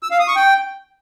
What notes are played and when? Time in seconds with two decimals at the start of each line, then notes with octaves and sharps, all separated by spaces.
0.03 E6
0.11 F5
0.19 D#6
0.28 C#6
0.36 G5